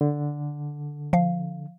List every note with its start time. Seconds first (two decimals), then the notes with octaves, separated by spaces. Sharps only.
0.01 D3
1.13 F3 F5